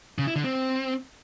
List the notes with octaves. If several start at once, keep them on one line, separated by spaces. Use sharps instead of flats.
C#3
E4
D3
C4